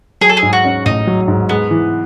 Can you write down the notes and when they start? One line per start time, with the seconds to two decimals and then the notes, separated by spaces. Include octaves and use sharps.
0.21 F#3 G#4
0.29 A4
0.37 G#4
0.42 G#2
0.53 F#4
0.64 C#4
0.85 A1 D#4
1.07 F#3
1.28 G#2
1.49 G#3 B3
1.71 E3